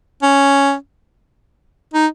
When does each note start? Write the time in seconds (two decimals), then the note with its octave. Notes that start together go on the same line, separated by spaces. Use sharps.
0.23 C#4
1.94 D#4